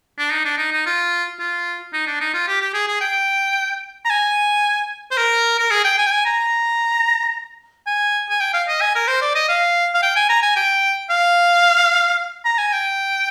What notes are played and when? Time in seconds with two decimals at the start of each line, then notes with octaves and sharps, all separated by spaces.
0.18 D4
0.31 D#4
0.45 D4
0.58 D#4
0.72 D#4
0.86 F4
1.40 F4
1.93 D#4
2.07 D4
2.20 D#4
2.34 F4
2.48 G4
2.61 G4
2.74 G#4
2.88 G#4
3.01 G5
4.05 A#5
4.10 G#5
5.11 C5
5.17 A#4
5.59 A#4
5.71 G#4
5.85 G5
5.98 G#5
6.06 G5
6.12 G#5
6.25 A#5
7.87 G#5
8.29 G#5
8.40 G5
8.53 F5
8.68 D#5
8.81 G#5
8.95 A#4
9.07 C5
9.22 D5
9.35 D#5
9.49 F5
9.94 F5
10.03 G5
10.16 G#5
10.29 A#5
10.43 G#5
10.56 G5
11.10 F5
12.45 A#5
12.58 G#5
12.73 G5